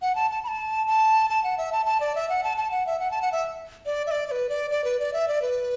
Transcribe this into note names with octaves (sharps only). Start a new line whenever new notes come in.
F#5
A5
A5
B5
A5
A5
A5
F#5
E5
A5
A5
D5
E5
F#5
A5
A5
F#5
E5
F#5
A5
F#5
E5
D5
E5
D5
D5
B4
D5
D5
B4
D5
E5
D5
B4